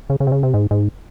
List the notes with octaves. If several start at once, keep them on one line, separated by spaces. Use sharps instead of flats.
C#3
C#3
C3
C#3
C3
G#2
G#2